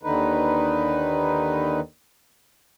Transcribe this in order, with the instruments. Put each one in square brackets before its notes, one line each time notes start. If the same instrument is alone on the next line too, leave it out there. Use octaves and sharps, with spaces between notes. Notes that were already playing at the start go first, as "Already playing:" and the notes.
[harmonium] D#2 D3 D#3 D#4 B4